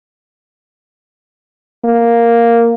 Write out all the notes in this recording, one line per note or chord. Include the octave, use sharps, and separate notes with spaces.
A#3